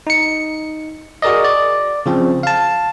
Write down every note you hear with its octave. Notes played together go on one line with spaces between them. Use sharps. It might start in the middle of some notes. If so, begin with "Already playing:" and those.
D#4 C#7
F#4 G#4 A#4 D5 D#5
D5
C#3 F3 C4
F5 A5